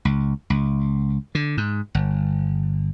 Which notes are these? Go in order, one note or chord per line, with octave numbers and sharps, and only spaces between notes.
C#2
C#2
D3
G#2
G1